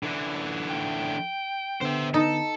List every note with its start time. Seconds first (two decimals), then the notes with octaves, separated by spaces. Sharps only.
0.03 D3 E3
0.70 G5
1.81 D3 B3 C5 E5
2.14 D#4 A4